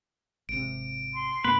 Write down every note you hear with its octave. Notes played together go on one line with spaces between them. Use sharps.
G#1 C3 D7
C6
F#2 B2 A#3 B4